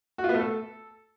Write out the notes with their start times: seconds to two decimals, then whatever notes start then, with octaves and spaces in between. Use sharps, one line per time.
0.18 F#4
0.24 F4
0.29 B3
0.34 A3
0.40 A4